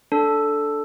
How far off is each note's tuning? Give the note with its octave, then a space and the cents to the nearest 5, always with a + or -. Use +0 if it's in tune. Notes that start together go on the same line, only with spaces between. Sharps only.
D4 -5 A4 +0